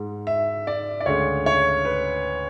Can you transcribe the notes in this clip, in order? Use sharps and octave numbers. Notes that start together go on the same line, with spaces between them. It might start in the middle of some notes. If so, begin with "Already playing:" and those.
Already playing: G#2 G#3
E5
D5
D5
D2 C#3 G#3 C#5
C#5
B4